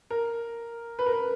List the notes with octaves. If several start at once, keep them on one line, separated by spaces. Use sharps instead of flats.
A#4
B4
A#4
B4